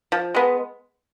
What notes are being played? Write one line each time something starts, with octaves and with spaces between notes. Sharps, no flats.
F3
G#3 B3